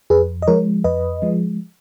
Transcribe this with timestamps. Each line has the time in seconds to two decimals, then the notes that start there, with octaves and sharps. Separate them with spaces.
0.10 F2 G#4 B4
0.42 D#5
0.47 F3 G#3 A#4 C#5
0.84 F2 B4 D#5
1.22 F3 G#3